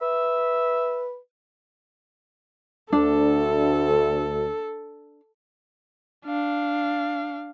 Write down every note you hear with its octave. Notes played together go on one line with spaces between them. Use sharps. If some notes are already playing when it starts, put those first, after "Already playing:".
B4 E5
D2 D4 A4
D4 F5